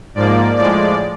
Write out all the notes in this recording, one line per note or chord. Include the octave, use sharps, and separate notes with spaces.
G#2 F3 A#3 D5
A2 F3 G#3 D5